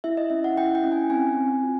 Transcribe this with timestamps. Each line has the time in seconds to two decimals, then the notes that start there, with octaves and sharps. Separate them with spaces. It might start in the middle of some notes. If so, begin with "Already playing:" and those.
0.04 E4 E5
0.17 D#5
0.30 C#4 E5
0.44 F#5
0.57 E4 G5
0.75 G5
0.84 C#4
0.92 G#5
1.10 C4 G#5
1.37 C4
1.63 F4